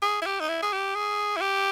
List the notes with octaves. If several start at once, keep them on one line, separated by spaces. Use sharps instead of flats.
G#4
E4
G4
D#4
E4
G#4
G4
G#4
E4
G4